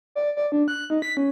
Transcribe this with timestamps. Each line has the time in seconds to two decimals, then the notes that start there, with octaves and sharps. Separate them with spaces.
0.15 D5
0.36 D5
0.52 D4
0.68 F#6
0.90 D#4
1.02 B6
1.17 C#4